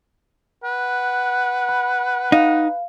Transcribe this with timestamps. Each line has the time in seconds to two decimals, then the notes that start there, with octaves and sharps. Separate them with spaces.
0.64 B4 F#5
1.69 B5
2.32 D#4 F5